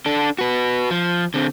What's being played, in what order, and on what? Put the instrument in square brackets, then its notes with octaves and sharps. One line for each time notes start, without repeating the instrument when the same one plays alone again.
[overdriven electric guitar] D4 A4
F#4 B4
F3
D3 C4